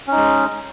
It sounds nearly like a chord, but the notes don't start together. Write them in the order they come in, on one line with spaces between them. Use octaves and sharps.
C#4 D#4 G#3